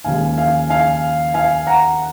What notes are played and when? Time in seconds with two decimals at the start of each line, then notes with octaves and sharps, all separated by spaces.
0.04 D#2 C#3 F3 G#3 F5 G#5
0.38 F5 G#5
0.70 F5 G#5
1.34 F5 G#5
1.67 F#5 A#5